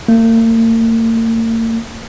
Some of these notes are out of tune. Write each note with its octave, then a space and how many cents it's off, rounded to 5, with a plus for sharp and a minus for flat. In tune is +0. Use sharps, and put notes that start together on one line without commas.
A#3 -45